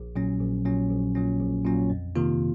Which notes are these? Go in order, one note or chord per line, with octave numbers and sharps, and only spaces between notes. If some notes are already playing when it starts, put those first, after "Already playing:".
Already playing: A#1
A#2 F#3 C#4
A#1
A#2 F#3 C#4
A#1
A#2 F#3 C#4
A#1
A#2 F#3 C#4
F2
C3 D#3 A#3 F4